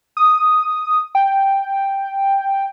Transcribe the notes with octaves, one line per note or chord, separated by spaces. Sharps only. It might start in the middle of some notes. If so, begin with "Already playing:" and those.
D#6
G5